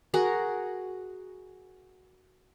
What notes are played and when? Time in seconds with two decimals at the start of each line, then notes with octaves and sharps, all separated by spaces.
0.14 F#4 G#4 A#4 F#5